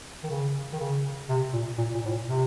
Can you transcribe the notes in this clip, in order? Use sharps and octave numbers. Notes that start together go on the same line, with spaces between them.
D#3
C#3
D#3
C#3
C3
A#2
A#2
A#2
A2
A#2
C3